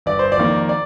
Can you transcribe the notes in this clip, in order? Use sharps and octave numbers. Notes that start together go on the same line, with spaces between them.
G1 D5
C5
D5
F2 D#3 A#3
D5